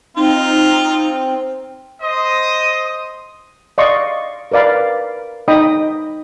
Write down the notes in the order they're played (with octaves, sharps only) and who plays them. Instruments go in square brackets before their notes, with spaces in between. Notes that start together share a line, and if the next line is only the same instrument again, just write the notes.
[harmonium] C4 [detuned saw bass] D#4 [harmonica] F4
[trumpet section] C5 D#5 D#6
[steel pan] D5 D#5 F5 C6 C#6
A#4 B4 D5 F5 B5
D#4 D#5 G5 B5 D#6